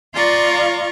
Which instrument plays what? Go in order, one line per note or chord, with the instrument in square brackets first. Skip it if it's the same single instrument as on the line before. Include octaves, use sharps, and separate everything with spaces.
[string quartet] F4 D5 F5 A#5 C6 C#6